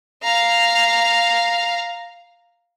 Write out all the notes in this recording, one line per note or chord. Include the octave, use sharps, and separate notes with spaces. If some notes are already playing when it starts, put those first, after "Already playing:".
F5 A#5